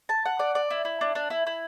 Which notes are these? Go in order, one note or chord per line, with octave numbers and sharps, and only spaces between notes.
A5
F#5
D5
D5
E4
E4
D4
D4
E4
E4